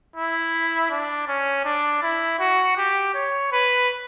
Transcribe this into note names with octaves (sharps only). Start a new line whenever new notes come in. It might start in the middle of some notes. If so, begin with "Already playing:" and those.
E4
D4
C#4
D4
E4
F#4
G4
C#5
B4